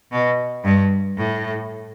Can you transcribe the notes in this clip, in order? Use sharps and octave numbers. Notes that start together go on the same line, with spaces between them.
B2
G2
A2